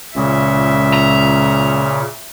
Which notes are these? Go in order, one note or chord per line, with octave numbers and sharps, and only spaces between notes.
C#2 A#2 C#3 E5
A#5